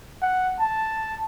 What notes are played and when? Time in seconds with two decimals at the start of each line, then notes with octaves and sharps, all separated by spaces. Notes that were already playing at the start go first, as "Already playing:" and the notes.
0.22 F#5
0.60 A5